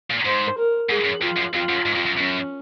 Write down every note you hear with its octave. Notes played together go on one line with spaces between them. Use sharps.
A#2
G#2 C5
A#4
G#2 G#4
F#2
F2 F4
F#2
F2 F4
F#2
G#2
F2
F#2
F#2 C#4